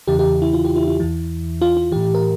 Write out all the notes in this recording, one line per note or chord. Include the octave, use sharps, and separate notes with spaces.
E2 C#3 E3 G4
G4
E4
F4
G4
E4
E4
E2 E3
F4
F4
A2 E3 G4
A#4